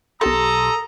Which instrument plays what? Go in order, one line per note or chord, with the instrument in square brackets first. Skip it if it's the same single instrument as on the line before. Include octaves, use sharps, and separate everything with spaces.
[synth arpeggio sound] B1 G4 C6 [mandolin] A4 [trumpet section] A#5 D#6